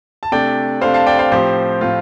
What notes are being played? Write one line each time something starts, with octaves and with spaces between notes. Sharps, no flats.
A5
C3 A3 D4 D5 G5
C3 A3 D4 C5 F5
F5 A5
D5 G5
C5 F5
A2 F3 C4 G4 C5
A2 F3 C4 F4